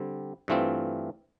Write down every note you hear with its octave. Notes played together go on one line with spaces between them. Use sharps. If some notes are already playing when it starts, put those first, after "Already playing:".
Already playing: D3 G3 C4
G2 E3 A3 C4 F4